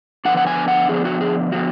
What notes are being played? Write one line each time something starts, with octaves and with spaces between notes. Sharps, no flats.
D3 F3 B3 D4 F#5
F#5
G#5
F#5
D3 F3 B3 D4 G#4
F#4
G#4
D3 F3 B3 F#4